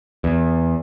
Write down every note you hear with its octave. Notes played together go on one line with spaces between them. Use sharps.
E2